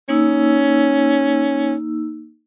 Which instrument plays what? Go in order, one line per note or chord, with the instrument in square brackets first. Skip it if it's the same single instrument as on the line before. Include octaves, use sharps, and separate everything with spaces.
[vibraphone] A#3 D#4 E6 [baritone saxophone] C#4